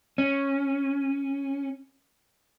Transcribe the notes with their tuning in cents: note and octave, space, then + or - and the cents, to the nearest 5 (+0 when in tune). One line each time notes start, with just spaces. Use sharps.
C#4 -5